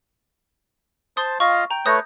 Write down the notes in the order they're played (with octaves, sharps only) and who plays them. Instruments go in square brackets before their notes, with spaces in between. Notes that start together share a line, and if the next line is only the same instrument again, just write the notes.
[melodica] C5 A5 [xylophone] C6 D#6
[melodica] F4 D#5 F5 [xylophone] C#6
[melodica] G5 [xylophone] A#5
[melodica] A3 B4 C#5 [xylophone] D#6 G6 A#6